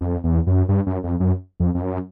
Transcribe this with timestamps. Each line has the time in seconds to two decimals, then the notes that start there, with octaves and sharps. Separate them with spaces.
0.01 F2
0.24 E2
0.47 F#2
0.69 G2
0.86 F#2
1.04 F2
1.20 F#2
1.60 F2
1.74 F2
1.82 F#2